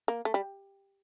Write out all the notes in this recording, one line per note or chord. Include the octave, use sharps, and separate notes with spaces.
A#3
A3
G3